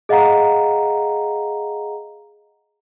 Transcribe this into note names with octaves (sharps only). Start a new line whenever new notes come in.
G#4 D#5 F5 F#5 A#5